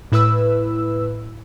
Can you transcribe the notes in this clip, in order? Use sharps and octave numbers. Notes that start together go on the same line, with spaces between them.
A2 E4 B4 E6